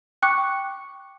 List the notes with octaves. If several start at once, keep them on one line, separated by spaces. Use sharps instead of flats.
G5 C#6 D6 F#6 C#7